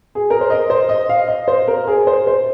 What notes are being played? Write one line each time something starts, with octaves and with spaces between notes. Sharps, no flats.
G#4
A#4
C5
D#5
C5
D#5
F5
D#5
C5
A#4
G#4
C5
C5